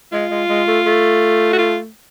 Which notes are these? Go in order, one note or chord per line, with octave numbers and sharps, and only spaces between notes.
G#3 F4
G#3
G#3
A3
A3
F#4
F4